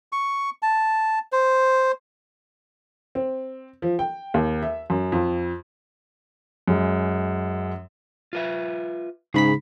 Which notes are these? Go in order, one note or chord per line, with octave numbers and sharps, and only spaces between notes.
C#6
A5
C5
C4
F3
G5
D#2
E5
F#2
F2
F#2 G#3
F4 B4 E5
G#2 C#3 G#4 B5 B6